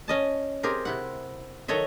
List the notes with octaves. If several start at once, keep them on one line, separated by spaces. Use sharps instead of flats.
C#4 D#5 A5
C4 G4 G#4 A#4
C3 E4 F#5
D#3 F#3 A4 C#5 D#5 E5